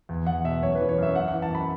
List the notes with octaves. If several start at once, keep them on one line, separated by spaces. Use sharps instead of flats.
E2
E2 F#5
B2 E5
F#2 C#5
B4
E3
C#5
F#2 E5
F#2 F#5
F#5
E3
A5
F#2 B5